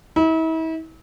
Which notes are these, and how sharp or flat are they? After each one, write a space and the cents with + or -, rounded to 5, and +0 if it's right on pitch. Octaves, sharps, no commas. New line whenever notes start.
E4 -40